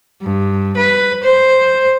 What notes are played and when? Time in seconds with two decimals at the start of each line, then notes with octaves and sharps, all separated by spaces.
0.22 G2
0.77 B4
1.23 C5